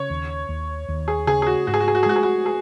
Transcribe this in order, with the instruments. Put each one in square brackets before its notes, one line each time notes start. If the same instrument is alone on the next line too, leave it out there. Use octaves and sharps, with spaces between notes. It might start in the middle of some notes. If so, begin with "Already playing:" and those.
Already playing: [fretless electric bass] C#3 [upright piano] C#5
[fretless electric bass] D#2
D#2
D#2
[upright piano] G#4
[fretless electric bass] C#3 [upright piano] G#4
[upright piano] G#4
F#4
[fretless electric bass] G#2 [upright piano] F#4
[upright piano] G#4
F#4
G#4
F#4
G#4
[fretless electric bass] G#3 [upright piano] F#4
[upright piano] G#4
F#4
G#4